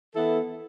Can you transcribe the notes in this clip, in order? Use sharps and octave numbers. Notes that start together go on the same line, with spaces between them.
E3 B3 E4 A4